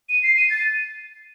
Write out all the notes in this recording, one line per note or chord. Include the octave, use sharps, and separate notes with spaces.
D#7
C7
D#7
A6